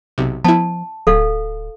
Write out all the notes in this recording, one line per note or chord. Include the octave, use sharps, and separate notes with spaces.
B1 C3
F3 B3 E4 A5
D1 A4 F5